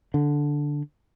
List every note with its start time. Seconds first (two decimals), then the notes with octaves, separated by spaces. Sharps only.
0.14 D3